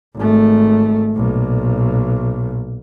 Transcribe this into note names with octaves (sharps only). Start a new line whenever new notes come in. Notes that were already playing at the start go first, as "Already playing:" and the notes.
G#1 A3
B1 A#2